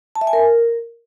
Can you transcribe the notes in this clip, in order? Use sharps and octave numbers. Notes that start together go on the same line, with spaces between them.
A5
E5
G#5
A#4